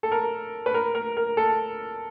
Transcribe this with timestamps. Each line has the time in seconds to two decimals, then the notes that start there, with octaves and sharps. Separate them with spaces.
0.03 A4
0.12 A#4
0.66 B4
0.74 A#4
0.95 A#4
1.17 A#4
1.37 A4